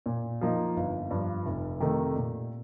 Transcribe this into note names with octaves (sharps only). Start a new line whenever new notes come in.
A#2
F3 A#3 D#4
G1
G2 F3
F1
F2 C3 D#3 A3
A#2